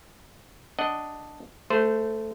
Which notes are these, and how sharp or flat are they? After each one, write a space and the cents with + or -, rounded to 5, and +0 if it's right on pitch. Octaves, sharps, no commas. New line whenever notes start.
D4 +0 D#5 +0 F#5 +15
A3 +0 C5 -20